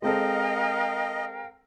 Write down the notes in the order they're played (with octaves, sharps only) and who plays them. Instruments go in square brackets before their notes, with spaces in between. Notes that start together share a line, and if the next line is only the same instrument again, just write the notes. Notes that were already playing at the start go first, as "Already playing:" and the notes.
[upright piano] G#3 C4 A4 [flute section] A#4 F5 G5 [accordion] D#5